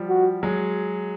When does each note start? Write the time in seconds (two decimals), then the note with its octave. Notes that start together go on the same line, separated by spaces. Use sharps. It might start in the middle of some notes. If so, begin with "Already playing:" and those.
Already playing: F3 G3
0.09 F#4
0.43 F#3 G#3